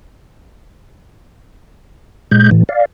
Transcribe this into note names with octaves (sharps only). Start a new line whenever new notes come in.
A#2 G#3 G6
A2 E3
D5 F5